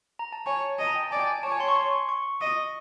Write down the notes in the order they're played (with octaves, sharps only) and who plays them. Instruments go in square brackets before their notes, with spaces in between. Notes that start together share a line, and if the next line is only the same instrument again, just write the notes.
[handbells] A#5
A5
[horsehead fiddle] C#5 [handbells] G#5
[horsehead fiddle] D#5 [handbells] A5
[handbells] A#5
G5
A5
[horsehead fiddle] D5 [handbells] G#5
[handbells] G5
G#5
[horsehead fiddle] C#5 [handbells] A5
[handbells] G#5
C6
C#6
C6
C#6
[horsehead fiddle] D#5